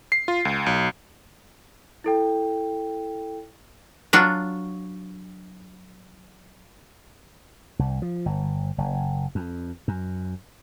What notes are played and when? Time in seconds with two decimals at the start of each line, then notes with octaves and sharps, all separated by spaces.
0.12 C7
0.28 F4
0.45 C#2
0.66 B1
2.04 E4 A4 G5
4.13 F#3 D4 F4 F#4
7.79 C2
8.02 F3
8.26 G1
8.78 F#1
9.35 F2
9.88 F#2